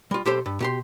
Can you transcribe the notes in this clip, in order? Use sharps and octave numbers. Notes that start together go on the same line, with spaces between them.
G3 F4
B1 G4 A4 C5 C6
G2
B2 G4 C6